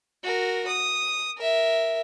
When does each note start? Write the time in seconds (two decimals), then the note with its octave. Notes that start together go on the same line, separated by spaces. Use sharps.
0.23 F#4 A#4
0.67 D#6
1.37 A#4 E5